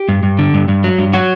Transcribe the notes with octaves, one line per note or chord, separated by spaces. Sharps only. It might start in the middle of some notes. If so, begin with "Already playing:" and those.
Already playing: G4
G2
G2
D3
G2
G2
F#3
G2
F#3 F#4